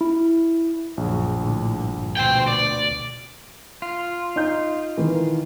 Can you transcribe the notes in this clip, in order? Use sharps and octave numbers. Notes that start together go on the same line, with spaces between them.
E4
A#1 F#2 C#3
A2 D3
G1
D2 B2 C5 G5
D5
F4
D#4 G6
D#3 E3